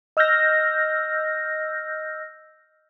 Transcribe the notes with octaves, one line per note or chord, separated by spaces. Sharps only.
D#5 E6 F6 G6 A#6